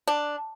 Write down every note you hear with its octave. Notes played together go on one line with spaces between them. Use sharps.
D4